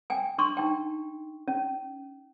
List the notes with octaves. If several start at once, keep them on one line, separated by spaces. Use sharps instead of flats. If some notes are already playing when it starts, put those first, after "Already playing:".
G5 G#5
D4 C6 C#6
D#4 G5
C#4